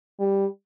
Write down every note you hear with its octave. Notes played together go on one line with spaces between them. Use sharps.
G3